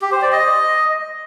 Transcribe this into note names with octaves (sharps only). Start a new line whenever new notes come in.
G4
C5
D5
D#5